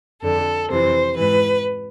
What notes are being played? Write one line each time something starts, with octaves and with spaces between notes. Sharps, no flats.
F2 D3 A4
F2 C3 E3 C5
G#2 E3 B4